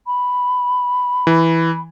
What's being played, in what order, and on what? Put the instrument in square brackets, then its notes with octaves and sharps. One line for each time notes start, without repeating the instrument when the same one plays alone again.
[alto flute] B5
[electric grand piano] E3